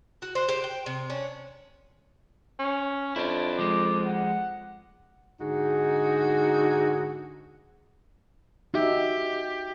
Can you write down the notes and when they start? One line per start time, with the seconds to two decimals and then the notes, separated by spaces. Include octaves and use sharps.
0.22 F#4
0.35 C5 F#5
0.49 G4 C5
0.64 G5
0.86 C3
1.10 C#4 D4
2.59 C#4
3.16 F2 D4 E4
3.59 F3 G#3 D6
4.05 F#5
5.40 G#2 D3 D#4 F#4 G#4
8.74 D#4 F#4 G4 E5